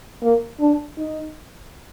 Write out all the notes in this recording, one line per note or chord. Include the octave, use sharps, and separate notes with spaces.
A#3
D4
D#4